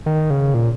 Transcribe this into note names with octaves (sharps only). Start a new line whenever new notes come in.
D#3
C#3
A#2